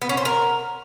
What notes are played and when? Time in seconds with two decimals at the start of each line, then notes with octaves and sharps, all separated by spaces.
0.02 B3
0.09 C#4
0.17 C5
0.25 A#4